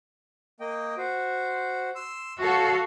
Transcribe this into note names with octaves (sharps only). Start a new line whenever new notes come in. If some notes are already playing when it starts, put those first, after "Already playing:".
A#3 D#5 G5
F#4 C5
C6 E6
F#4 A4 C#5 F5 F#5 C#6